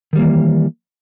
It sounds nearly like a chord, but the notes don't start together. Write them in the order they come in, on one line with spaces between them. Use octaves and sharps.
D#3 G3 A#3 E3